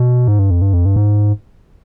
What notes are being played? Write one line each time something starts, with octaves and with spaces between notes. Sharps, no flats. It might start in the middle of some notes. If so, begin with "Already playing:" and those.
Already playing: B2
G#2
G2
F2
G2
F2
G2
G#2